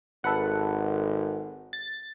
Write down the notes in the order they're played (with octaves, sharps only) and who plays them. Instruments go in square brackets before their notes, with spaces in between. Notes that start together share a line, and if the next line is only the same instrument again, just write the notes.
[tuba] G#1 [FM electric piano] A4 B4 F#5
[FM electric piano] A6